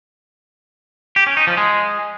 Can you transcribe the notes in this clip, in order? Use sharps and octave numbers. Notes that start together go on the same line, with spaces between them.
G4
C#4
D#4
F3
G#3